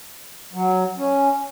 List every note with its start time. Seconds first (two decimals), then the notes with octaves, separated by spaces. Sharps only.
0.53 F#3
0.98 C#4